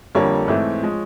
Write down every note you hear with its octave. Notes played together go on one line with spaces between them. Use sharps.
F2 D3 G3 A#3 C#5
G#2 E3 A3 C4
F3 G#3